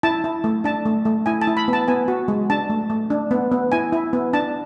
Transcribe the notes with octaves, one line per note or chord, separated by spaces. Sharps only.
E4 A5
E4
A3
D4 A5
A3
A3
E4 G#5
A5
E4
B5
B3
A5
B3 G#5
F#4
G#3
D4 A5
A3
A3
D4
B3
B3
E4 G#5
E4
B3
D4 A5